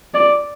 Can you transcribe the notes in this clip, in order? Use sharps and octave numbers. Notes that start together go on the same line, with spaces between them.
D5